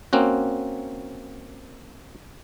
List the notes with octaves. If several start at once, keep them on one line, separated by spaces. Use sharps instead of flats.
A#3 C4 C#4 F#4